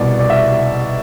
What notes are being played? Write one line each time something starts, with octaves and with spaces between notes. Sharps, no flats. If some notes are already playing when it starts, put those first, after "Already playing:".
Already playing: C2 B2 D5
D5
E5